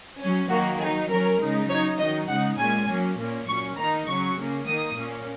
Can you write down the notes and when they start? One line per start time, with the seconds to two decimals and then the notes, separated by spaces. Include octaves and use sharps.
0.20 F#3 C#4
0.49 D#3 F#3 A#3 F#4
0.79 F#3 G#4
0.85 D#4
1.09 F#3 C#4 A#4
1.40 C#3 G#3 D#4
1.69 F#3 D#4 C#5
1.98 D#3 F#3 D#4 D#5
2.28 C#3 G#3 D#4 F#5
2.58 A#2 G#3 C#4 G#5
2.88 F#3 A#3 C#4
3.18 A#2 A#3 C#4
3.47 A#2 F#3 C#4 C#6
3.77 D#3 A#3 D#4 A#5
4.07 C#3 F#3 C#4 C#6
4.37 C#3 A#3 C#4
4.67 D#3 A#3 D#4 D#6
4.96 A#2 A#3 C#4